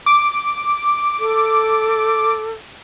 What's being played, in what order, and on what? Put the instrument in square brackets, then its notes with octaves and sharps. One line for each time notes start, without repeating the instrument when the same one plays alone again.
[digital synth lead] D6
[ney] A4